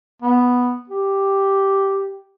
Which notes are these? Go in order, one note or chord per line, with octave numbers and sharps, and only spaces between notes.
B3
G4